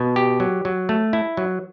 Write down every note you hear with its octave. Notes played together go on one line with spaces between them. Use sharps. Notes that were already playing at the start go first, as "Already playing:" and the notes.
Already playing: B2
G4
F#3
F#3
A3
E4
F#3